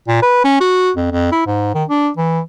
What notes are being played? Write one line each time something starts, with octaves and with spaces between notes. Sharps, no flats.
A#2
B4
C#4
F#4
F2
F2
E4
G#2
D#3
D4
E3